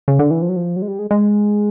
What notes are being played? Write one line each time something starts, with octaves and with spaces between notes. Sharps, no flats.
C#3
D3
E3
F3
F#3
F3
F#3
G#3
G3
G#3
G#3